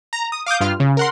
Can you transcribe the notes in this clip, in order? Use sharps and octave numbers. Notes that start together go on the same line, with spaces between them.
A#5
D#6
F5 D6 D#6 G6
G2 F4 F6
C#3
A#4 F#5 C6